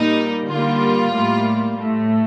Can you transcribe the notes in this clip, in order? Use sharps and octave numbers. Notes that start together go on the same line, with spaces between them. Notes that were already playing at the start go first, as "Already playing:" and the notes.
Already playing: A#2 G3 A#3 D#4
D3 G3 A#3 F4
A2 G3 A#3
A2 A3